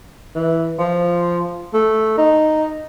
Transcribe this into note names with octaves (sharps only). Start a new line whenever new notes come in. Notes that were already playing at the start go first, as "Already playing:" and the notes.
E3
F3
A3
D#4